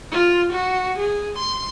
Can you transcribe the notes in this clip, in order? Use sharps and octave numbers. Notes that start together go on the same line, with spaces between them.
F4
F#4
G#4
C6